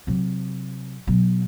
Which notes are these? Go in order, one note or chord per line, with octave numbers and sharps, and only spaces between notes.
C3 F#3
B2 F#3